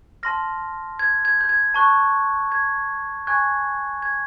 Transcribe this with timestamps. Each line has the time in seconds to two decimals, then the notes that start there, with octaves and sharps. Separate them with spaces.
0.23 A5 C6 F6 A#6
0.99 G#6
1.25 G#6
1.41 G6
1.49 G#6
1.74 A5 C#6 F#6
2.52 G#6
3.27 G#5 C#6 F#6 G#6
4.02 G#6